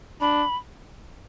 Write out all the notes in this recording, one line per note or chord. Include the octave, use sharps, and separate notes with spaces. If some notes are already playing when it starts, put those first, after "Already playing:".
D4 B5